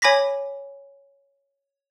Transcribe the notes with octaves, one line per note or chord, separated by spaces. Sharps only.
C#5 G#5 B5 D6 A#6 B6